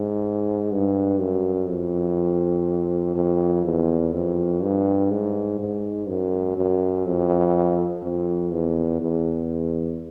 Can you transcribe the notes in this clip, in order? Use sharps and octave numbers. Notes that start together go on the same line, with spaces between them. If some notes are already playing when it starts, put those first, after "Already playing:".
Already playing: G#2
G2
F#2
F2
F2
E2
F2
G2
G#2
G#2
F#2
F#2
F2
F2
E2
E2